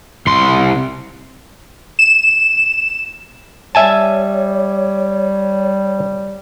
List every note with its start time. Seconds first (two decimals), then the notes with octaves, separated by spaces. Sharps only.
0.27 C2 C6
1.99 E7
3.75 G3 C#5 E5 G#5 A5